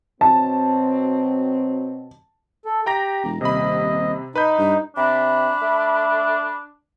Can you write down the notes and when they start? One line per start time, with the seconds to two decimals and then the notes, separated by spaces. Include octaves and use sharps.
0.21 B2 F#3 C4 A5
2.65 A4
2.86 G4 G5 A#5 A#6
3.23 E1
3.41 D#1 C3 D#5 B5
4.35 D#4 B4 B5 G6
4.58 G2
4.96 C3 D4 B5
5.61 A3